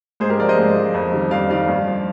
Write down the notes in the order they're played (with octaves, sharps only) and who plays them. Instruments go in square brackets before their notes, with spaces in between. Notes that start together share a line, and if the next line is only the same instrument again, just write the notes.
[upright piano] G#2 G#4 C5
G4 A#4
F3 A#4 D5
C5 D#5
G#2
F3
F2
D#3 G3
F2 D5 F5
D#3 G3 D5 F5
G2
F3